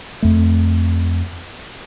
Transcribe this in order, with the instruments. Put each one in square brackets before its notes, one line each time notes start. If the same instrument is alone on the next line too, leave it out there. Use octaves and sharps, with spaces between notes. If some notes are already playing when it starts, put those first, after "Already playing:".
[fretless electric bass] F2 A3